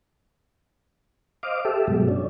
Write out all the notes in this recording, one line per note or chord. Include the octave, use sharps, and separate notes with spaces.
C5 D#5 F5 D6
G4 A4 E5
G2 B2 F#3 G#3
C#4 D4